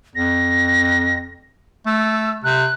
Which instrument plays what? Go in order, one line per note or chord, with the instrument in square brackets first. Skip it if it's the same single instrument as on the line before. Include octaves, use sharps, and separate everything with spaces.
[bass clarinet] F2 [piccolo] A#6
[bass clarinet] A3 [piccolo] E6
[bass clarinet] C3 [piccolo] F#6